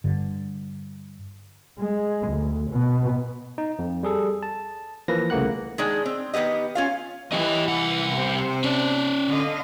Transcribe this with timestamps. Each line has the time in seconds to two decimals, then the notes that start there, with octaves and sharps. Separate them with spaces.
0.04 G2 D3
1.79 G#3
2.28 D2
2.71 B2
3.58 D#4
3.79 F2
4.03 G3 G#4 A4
4.43 A5
5.08 E3 F3 A#3 B4 A#6
5.30 C2 C#3 A3 A#3 F#5 F#6
5.78 D#3 G#3 D4
6.05 C4
6.33 D#3 G#3 B3 G4 D#5
6.75 C#4 F4 F5
7.32 E3 G4 D#5
7.68 C2 F#5
8.14 C3 C5
8.64 C#4 D5
9.32 D3 D#5 F5